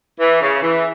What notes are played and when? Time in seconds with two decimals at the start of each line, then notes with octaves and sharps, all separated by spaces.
0.19 E3
0.41 C#3
0.62 E3